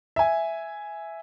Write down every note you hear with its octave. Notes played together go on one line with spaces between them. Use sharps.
E5 G#5